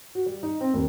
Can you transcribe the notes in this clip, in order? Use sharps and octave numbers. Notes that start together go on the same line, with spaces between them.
F#4
G3
D#4
C4
D#2